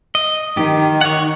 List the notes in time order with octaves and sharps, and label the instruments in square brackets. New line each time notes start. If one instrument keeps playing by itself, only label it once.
[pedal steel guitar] D#5
[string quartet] D#3 [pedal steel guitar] G4
[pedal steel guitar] C#5 F#5